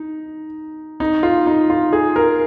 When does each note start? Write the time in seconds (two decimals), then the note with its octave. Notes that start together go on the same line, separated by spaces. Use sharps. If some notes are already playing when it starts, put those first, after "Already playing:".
Already playing: D#4
1.00 D#4
1.23 F4
1.47 D#4
1.70 F4
1.93 G#4
2.16 A#4